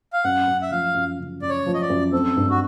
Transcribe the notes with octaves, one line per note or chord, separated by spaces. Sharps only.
F5
F#2 F#5
F#2
E5
F3 F5
F#2
C#3
F#2 D5
C#5
F3
D#5
D5
F#2
C4 A4
G2
F#4